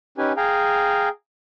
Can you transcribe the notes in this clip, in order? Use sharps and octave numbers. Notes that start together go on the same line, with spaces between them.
C#4 D#4 G4 B4 G#5
G#4 F5 G5 G#5 A#5